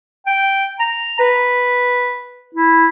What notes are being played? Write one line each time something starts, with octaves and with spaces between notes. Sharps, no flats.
G5
A#5
B4
E4